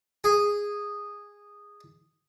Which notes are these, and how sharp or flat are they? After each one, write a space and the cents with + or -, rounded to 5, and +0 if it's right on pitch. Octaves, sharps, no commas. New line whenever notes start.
G#4 -10